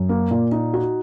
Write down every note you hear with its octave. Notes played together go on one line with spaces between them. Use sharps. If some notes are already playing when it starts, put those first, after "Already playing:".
Already playing: F#2
A#3
A#2
D#4
F#4